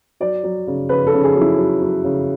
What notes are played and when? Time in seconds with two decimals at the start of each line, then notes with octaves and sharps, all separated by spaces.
0.20 F#3 D5
0.44 F#3
0.67 C#3
0.89 C#3 B4
1.07 A4
1.13 C#3
1.24 G#4
1.35 F#3
1.41 E4
1.58 F#3
1.81 F#3
2.04 C#3